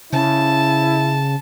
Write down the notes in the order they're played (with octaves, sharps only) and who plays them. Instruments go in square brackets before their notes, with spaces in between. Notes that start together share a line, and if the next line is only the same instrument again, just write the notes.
[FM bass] C#3 [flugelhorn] E4 [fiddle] A5